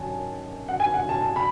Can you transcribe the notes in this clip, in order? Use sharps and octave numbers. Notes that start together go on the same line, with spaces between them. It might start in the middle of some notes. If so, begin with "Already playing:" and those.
Already playing: F#2 D#3 G#5 A5
F#5
G#5
F#5
A5
A5
B5